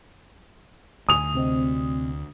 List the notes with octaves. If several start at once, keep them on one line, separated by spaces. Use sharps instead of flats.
D2 G#5 D#6 F7
C3 C4 D#5